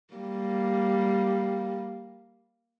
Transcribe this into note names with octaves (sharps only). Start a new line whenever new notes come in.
G3 A#3